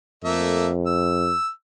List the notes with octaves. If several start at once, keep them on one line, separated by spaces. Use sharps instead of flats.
F2 A3 A#3 E5
E6